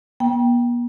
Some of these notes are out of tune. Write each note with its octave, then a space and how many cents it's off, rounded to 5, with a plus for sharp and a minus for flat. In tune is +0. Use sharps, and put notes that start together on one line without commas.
B3 -45 G5 +0